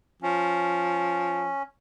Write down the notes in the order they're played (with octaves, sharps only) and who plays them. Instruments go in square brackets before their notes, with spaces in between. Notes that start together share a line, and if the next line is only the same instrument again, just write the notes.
[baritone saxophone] F3 [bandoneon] C#4